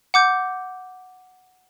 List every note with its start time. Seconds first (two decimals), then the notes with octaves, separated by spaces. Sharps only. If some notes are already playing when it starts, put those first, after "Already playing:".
0.14 F#5 D6 G6